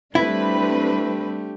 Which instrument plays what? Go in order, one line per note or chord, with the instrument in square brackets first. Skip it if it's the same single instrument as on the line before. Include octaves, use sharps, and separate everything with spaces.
[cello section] G3 C4 B4 [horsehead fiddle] A3 G4 [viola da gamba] D4 [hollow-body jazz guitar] E4